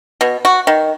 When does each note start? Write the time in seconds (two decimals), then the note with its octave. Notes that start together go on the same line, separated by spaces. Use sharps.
0.21 B2
0.45 F#4
0.67 D#3